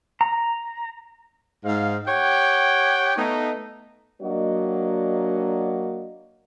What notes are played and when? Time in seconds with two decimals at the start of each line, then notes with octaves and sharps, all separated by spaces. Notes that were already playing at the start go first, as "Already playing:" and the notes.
0.21 A#5
1.65 G#2 F5
2.08 G4 C#5 F#5 G5
3.17 A3 B3 D#4
4.22 F#3 A#3 D4 F#4 D5 D#5